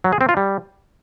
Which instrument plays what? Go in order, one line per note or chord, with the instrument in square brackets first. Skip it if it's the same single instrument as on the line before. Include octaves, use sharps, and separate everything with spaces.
[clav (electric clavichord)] F#3
G#4
C4
F4
G3